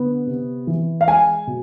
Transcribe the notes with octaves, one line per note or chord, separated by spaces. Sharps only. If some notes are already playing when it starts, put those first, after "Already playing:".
Already playing: D3 B3
C3
E3
F5
G#3 G#5
B2